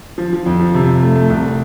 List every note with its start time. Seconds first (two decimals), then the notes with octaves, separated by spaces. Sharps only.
0.18 F3
0.33 F3
0.46 F2
0.60 F3
0.74 C3
0.88 C3
1.03 A3
1.16 A3
1.29 C2